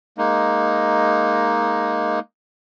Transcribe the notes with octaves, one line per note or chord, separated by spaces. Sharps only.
G#3 A#3 D#4